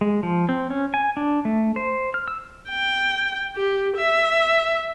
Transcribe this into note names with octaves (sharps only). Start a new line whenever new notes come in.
G#3
F3
C4
C#4
G#5
D4
A3
C5
F6
E6
G5
G4
E5